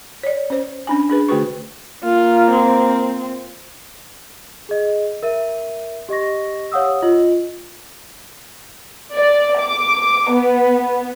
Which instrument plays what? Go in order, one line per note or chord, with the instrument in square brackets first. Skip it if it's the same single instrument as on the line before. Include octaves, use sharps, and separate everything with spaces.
[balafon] C#5 D5
C#4 C5
C#4 D4 G#5
D4 G#4 B4
D3 A3 F#4 G#4 B4 C#6
[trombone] A#3 [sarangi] F4
[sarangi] C4
[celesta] G#4 D#5
A#4 E5 D#7
G4 D#5 C#6 A#6
G4 C#5 F5 F#5 D#6 E6
F4 D#5 F#7
[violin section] D5
D6
B3